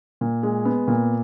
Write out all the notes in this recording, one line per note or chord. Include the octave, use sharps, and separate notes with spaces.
A#2
G#3
B3
A#2